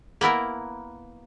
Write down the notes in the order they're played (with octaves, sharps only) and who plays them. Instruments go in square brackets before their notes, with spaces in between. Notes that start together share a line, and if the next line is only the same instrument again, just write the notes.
[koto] A#3 B3 E4 A#4